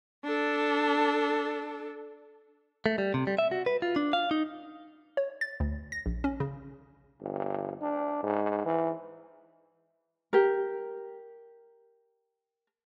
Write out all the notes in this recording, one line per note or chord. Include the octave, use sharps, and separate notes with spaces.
D4 A4
A3
G3
C3
G3
E5
F#4
B4
F4
D4
F5
D#4
C#5
A6
D2
A#6
A#1
C#4
C#3
G1
D4
G#2
E3
G4 A#4